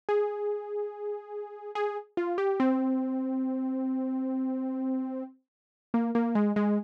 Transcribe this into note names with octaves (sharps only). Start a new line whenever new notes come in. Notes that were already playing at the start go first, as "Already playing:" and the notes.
G#4
G#4
F4
G4
C4
A#3
A#3
G#3
G#3